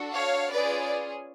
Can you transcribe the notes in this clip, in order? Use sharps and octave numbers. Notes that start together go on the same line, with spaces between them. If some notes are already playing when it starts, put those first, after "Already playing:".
Already playing: D4 F#4 A4
C#5 F5
C#4 F4 G#4 B4 D5